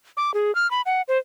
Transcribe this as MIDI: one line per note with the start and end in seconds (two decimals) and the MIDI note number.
0.17 0.34 86
0.34 0.54 68
0.55 0.69 89
0.71 0.82 83
0.86 1.02 78
1.08 1.18 72